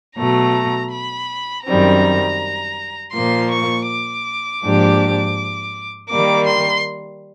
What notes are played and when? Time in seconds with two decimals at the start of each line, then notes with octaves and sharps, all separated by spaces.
0.16 B2 F#3 A3 A#5
0.91 B5
1.64 F#2 D#3 G3 C4 A#5
3.12 A#2 F3 A#3 C6
3.51 C#6
3.87 D6
4.62 G#2 F3 A#3 D4 G4
6.09 D#3 G3 A#3 D6
6.46 C6